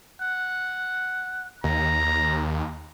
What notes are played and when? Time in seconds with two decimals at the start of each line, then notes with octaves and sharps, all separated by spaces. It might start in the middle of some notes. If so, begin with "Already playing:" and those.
0.21 F#5
1.64 D#2 A#5